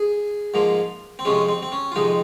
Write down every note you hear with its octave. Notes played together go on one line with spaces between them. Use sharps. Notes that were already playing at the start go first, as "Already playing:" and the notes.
Already playing: G#4
G#2 F3 A#3
C4
F2 C3 F3 G#3 C#4
C4
C4
C#4
F4
F2 C3 F3 G#3 D#4